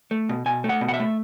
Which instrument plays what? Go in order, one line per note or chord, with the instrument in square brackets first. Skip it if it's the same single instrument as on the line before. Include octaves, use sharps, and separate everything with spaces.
[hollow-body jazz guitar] A3
B2
B2 G#5
A3
F#5
B2
F#5
E5
A3